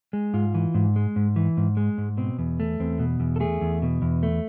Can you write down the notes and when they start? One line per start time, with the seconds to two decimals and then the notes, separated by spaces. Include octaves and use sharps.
0.13 G#3
0.34 G#2 F4
0.54 E3
0.74 G#2
0.96 G#3
1.16 G#2
1.36 E3
1.57 G#2
1.77 G#3
1.98 G#2
2.17 B2 C4
2.39 E2
2.60 A3
2.80 E2 C4
2.99 B2
3.20 E2
3.36 A4
3.40 A3 G#4
3.61 E2
3.82 B2
4.02 E2
4.23 A3